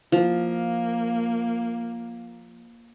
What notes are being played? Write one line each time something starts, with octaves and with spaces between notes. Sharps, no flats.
F3 A#3